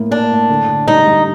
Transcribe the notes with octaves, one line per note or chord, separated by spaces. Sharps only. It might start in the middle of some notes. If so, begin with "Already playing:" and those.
Already playing: A2 A#3
A#3 D4
A2
D3
D3
G3 D#4
G3